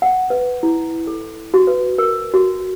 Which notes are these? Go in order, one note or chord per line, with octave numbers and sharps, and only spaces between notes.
F#5
B4
E4
A4
F#4
B4
A#4
F#4